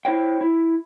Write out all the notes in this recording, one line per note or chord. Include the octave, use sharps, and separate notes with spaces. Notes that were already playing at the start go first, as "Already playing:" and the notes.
E4 C5 C#5 G5
E4